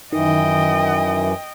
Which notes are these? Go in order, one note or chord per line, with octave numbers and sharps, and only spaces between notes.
F#2 D#3 E3 D#5 G5